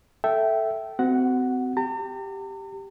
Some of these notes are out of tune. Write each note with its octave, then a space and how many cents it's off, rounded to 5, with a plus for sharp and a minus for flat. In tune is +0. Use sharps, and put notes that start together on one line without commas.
A4 +0 E5 +0 G5 -15
C4 -35 F#4 +25 F#5 +0
G4 +0 A#5 -45